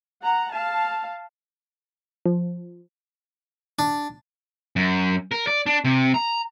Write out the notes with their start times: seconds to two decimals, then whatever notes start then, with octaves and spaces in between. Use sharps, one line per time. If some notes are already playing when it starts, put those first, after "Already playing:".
0.23 F#5 A#5
0.52 F5 A5
2.26 F3
3.79 D4
4.76 F#2
5.31 A#4
5.47 D5
5.66 D4
5.85 C3
6.14 A#5